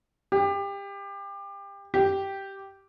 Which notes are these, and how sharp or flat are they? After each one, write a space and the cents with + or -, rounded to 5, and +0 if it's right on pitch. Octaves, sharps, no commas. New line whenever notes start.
G4 +25
G4 -5